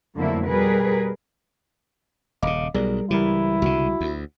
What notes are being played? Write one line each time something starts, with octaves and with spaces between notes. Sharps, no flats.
F2 D3 F#3 A3 A#3 E4
B2 G3 G#4 A#4 B4
D#1 C#3 D#5 F5 D6
B1 G3 G#4 A#4 D5
C#2 E3 G3 E4 G4 A#4
C2 D3 F#4
D2